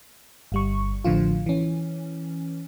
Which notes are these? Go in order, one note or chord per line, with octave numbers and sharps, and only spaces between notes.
G1 G3 C#6
A1 A2 D3 F3 F4
E3 C#4